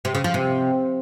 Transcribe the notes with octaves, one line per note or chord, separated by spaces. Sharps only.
C3
C#3
F3
C3